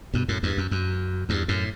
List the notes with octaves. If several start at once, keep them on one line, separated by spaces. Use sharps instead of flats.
G2 B2
F#2 A2
E2 G2
F#2
F#2
E2 G2
F#2 A2